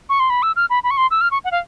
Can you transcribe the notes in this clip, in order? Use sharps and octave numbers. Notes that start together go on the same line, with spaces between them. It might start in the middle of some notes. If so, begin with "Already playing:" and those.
C#6
C6
B5
E6
F6
B5
B5
C#6
C6
E6
F6
C#6
F#5
F5